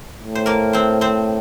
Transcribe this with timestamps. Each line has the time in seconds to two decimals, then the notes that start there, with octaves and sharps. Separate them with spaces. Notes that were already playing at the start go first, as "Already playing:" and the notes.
0.18 A2
0.35 C5
0.46 A#3 A#4
0.73 C4 C5
1.01 C4 C5